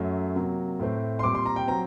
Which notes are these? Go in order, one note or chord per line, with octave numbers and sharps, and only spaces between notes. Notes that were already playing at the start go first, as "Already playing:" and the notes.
Already playing: F#2 F#3 A3
C3 F#3 A#3
A2 A3 C4
C6
A#2 G3 C4 D6
C6
A#5
G5
F#3 C4 A#5